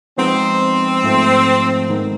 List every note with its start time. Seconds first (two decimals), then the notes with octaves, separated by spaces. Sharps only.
0.18 F3 G#3 B3 C4 D#4
1.04 G#2 F3 A3
1.89 D#3 G#3 B3 D#4